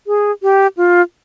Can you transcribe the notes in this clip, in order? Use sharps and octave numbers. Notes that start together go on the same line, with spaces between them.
G#4
G4
F4